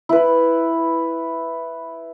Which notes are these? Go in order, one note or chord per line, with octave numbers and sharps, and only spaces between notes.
E4 B4